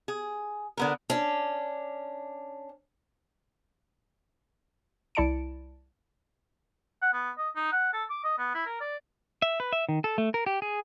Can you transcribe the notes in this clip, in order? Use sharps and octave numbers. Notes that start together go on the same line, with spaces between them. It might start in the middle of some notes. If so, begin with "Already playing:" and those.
G#4
D3 B3 A#4
C#4 D4
C2 E4 D5 A5 C#7 D7
F#5
B3
D#5
D#4
F#5
A4
D6
D#5
B3
E4
A#4
D5
E5
B4
E5
D#3
A4
A3
A#4
G4
G#4